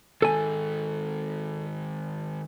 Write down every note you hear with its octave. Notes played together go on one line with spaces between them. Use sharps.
D#3 G#3 A4 G#5